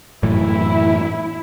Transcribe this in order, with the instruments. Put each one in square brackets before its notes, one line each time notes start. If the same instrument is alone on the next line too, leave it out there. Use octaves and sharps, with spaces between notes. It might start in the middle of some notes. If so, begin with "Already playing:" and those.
[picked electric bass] F#2 A2 E3 [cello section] E4